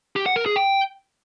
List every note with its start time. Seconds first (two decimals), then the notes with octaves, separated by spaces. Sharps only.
0.16 G4
0.26 F#5
0.36 A#4
0.46 G#4
0.56 G5